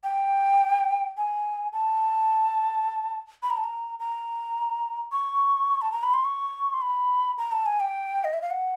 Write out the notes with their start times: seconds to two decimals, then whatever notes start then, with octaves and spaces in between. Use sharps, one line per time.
0.04 G5
1.17 G#5
1.73 A5
3.43 B5
3.50 A#5
3.57 A5
3.64 A#5
4.00 A#5
5.12 C#6
5.82 A5
5.92 A#5
6.03 B5
6.14 C6
6.25 C#6
6.74 C6
6.82 B5
7.38 A#5
7.52 A5
7.66 G#5
7.80 G5
8.24 D#5
8.33 E5
8.42 F5
8.51 F#5